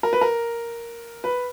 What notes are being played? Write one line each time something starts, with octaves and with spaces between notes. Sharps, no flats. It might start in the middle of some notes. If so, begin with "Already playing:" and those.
A#4
B4
A#4
B4